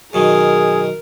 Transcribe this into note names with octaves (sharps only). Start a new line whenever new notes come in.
F#2 B2 D#3 G#4 A#4